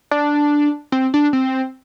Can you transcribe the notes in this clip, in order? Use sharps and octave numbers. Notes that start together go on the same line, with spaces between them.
D4
C4
D4
C4